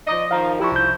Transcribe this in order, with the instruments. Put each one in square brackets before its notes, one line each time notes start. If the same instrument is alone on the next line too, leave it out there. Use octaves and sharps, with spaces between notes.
[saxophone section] F3 D5 D#5
[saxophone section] D#3 F3 [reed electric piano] F5 A#5
[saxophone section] F3 D4 E4 [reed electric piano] G4 C#6
[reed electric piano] C2 G6